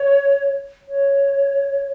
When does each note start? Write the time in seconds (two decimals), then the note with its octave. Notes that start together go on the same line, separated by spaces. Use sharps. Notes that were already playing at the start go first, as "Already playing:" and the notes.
Already playing: C#5
0.88 C#5